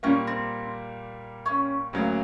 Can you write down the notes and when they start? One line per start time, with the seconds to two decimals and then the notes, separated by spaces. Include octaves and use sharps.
0.03 A#2 G3 A#3 C#4
0.27 C4
1.46 C#4
1.93 D2 C#3 F#3 A#3